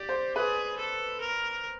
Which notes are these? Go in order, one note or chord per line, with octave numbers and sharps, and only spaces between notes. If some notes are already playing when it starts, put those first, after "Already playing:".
Already playing: G4 D5
C5
G#4 B4
A4
A#4